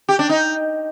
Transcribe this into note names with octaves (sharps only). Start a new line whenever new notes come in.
G4
D4
D#4